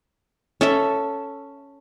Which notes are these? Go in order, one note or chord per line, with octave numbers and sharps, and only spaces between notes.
C#4 A4 E5